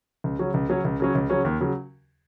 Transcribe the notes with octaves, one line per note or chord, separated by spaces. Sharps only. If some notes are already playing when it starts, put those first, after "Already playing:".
C#2
C#3 F#3 C#4
C#2
C#3 F#3 C#4
C#2
C#3 F#3 C#4
C#2
C#3 F#3 C#4
D#2
C#3 F#3